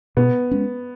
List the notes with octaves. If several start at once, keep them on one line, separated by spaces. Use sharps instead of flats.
B2 B3
G#3 C#4